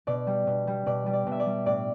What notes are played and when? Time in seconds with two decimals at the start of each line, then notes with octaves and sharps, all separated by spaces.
0.07 B2 D5
0.27 G3
0.47 B2
0.67 G3
0.86 B2 D5
1.06 G3
1.13 D5
1.27 B2
1.32 E5
1.40 D5
1.46 G3
1.66 A2 D5